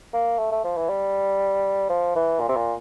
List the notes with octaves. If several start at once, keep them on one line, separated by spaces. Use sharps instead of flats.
A#3
A3
A3
F3
E3
G3
F3
E3
A#2
C3
A#2